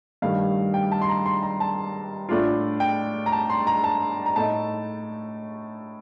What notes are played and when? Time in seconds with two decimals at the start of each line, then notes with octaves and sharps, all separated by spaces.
0.22 G2 D#3 A3 F5
0.74 G5
0.91 A5
1.01 C6
1.09 A#5
1.26 C6
1.43 A#5
1.60 A5
2.29 A2 A3 D4 F4
2.80 G5
3.26 A#5
3.32 A5
3.50 C6
3.67 A#5
3.84 A5
4.26 A#5
4.36 A2 A3 D#4 A5